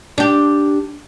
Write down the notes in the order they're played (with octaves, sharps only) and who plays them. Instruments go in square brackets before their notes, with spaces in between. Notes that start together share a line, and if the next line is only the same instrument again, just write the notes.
[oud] D4 G4